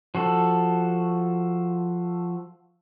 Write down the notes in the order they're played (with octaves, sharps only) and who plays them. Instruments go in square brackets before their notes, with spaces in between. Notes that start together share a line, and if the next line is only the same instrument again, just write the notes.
[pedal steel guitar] F3 F#4 A4